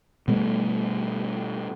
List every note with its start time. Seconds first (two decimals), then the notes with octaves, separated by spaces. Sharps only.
0.28 B2 G3 A3